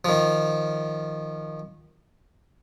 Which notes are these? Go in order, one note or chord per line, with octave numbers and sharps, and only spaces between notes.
D#3 F3